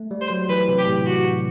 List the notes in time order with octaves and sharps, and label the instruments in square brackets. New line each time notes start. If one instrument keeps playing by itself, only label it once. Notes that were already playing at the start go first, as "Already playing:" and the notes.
Already playing: [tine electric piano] A3
G3
[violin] C5
[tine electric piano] F#3
[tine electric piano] E3 [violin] B4
[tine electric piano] C3
[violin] G4
[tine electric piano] A2
[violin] F#4